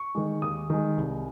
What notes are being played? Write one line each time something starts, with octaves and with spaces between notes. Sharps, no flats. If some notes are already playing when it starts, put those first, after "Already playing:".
Already playing: C#6
D#3 G#3
D#2 D#6
D#3 G#3
C2